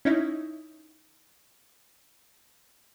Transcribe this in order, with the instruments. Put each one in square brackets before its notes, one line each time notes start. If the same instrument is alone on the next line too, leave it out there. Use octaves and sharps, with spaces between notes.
[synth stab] C#4 D#4 E4